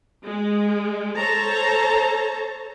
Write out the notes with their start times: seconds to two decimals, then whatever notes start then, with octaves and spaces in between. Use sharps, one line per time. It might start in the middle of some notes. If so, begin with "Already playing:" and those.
0.23 G#3
1.16 A4 C5 C#5 A5 A#5